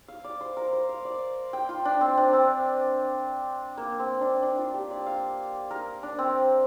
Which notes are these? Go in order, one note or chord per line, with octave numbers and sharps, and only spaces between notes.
F5
D5
C5
A#4
C5
F5
D5
G5
F4
D4
C4
D4
C4
A#3
C4
D4
D4
F4
G4
D5
F5
A#4
D4
C4